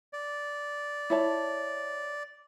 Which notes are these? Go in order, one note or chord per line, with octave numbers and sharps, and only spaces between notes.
D5
E4 C#5 A5